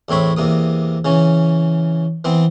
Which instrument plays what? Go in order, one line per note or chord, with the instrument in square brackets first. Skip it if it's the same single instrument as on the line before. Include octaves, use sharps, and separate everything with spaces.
[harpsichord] E2 A2 C4 C#5 B5
E2 C3 A#3 D#6
C#3 E3 C#4
E3 B3 C4